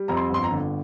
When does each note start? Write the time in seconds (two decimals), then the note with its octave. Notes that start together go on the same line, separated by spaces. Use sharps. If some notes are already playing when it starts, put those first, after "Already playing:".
Already playing: G3
0.08 F2 A#5
0.17 C6
0.30 G1 C6
0.44 A#5
0.51 D3